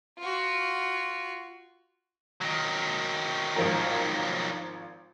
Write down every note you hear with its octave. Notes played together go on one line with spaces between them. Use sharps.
F4 F#4
D#3 F#3
G#1 F3 A#4